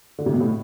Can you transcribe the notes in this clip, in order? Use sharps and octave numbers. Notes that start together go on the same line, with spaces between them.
D3
C3
B2
A2